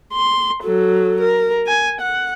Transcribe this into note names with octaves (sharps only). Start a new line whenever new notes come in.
C6
F#3 A4
A#4
G#5
F#5